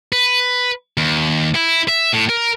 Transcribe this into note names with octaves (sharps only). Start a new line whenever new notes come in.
B4
D#2
E4
E5
A2
A#4